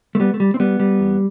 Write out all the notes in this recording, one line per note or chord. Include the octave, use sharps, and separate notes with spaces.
A3
G3 B3
A3
G3
C4
G3 B3
G3
E2